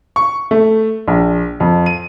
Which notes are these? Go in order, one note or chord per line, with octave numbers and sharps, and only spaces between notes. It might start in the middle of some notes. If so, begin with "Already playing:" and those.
C#6
A3
A#1
F2
D#7